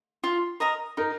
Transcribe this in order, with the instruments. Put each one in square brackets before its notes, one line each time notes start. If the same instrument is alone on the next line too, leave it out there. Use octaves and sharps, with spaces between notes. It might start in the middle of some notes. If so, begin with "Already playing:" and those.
[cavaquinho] F4
A#4 D#5 A#5
[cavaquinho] D#4 [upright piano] A#4